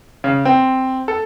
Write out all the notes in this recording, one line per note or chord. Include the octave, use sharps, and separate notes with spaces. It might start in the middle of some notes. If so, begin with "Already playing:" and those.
C#3
C4
A4